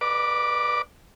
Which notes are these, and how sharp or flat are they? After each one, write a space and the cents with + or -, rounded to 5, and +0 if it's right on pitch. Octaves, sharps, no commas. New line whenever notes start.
B4 -20 D5 +35 D6 +0